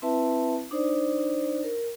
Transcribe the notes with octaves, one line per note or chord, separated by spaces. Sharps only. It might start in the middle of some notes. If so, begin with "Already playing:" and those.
C4 E4 B4 E5 A5
D4 D#4 C5 D5
A#4